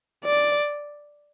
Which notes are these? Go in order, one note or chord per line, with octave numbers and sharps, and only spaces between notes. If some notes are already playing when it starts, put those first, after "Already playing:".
D5